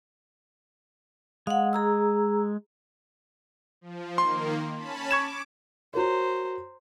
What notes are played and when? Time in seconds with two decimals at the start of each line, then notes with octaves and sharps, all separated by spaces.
1.47 G#3 F5 F#5
1.73 G#4 A#5 E6
3.81 F3
4.18 D#3 A#3 C6
4.75 C#4 A5 B5
5.11 C#6 D6 G#6 E7
5.94 F#4 A#4 C5 C#5 A#5